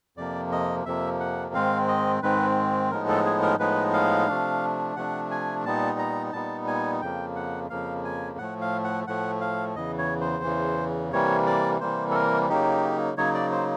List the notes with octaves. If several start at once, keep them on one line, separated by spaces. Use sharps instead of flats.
F2 C3 F3 A#3 D5
D#5
F2 C3 F3 A#3 E5
F#5
G#2 D#3 G#3 C4 F5
D#5
G#2 D#3 G#3 C4 B4
A2 F3 G#3 B3 D#4 A#4
A4
G#4
A#4
A2 F3 G#3 B3 D#4 B4
F5
C3 F3 A3 D4
C3 F3 A3 D4 F#5
G#5
A#2 G3 B3 D#4 A5
A#5
A#2 G3 B3 D#4 A5
G#5
F2 C#3 F3 A#3 G5
F#5
F2 C#3 F3 A#3 F5
G#5
A2 F3 A3 F#5
F5
F#5
A2 F3 A3 F#5
F5
E2 C#3 E3 D#5
C#5
C5
E2 C#3 E3
C3 E3 G3 A#3 C#5
D5
C3 E3 G3 A#3 C5
A4
A#4
C#3 F#3 A#3 D#4 G4
C#3 F#3 A#3 D#4 C#5
D5
C5